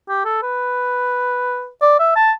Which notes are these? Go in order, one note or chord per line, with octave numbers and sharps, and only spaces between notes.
G4
A4
B4
D5
E5
A5